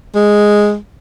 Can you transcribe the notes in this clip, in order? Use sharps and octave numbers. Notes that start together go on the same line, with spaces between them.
G#3